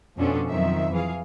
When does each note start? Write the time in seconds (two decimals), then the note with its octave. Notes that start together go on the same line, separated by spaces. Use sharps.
0.17 F2 B2 F3 C#4 D4 A4
0.49 F2 D#3 F3 F#3 E5
0.93 E3 G#4 F5